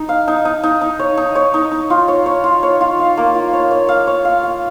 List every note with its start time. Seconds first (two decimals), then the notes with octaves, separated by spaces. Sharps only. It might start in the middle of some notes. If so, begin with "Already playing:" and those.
Already playing: D#4
0.09 F5
0.28 D#4
0.45 D#4
0.63 D#4
0.81 D#4
0.99 C#5
1.17 D#4
1.35 C#5
1.54 D#4
1.72 D#4
1.90 F4
2.08 C#5
2.26 C#5
2.44 F4
2.63 C#5
2.81 F4
2.99 F5
3.17 A#3
3.35 F4
3.53 C#5
3.71 C#5
3.89 F5
4.07 C#5
4.25 F5
4.43 F5